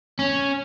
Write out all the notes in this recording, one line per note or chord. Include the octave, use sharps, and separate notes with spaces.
C#4